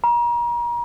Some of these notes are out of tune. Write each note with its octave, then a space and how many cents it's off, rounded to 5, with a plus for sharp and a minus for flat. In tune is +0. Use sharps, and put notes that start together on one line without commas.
A#5 +35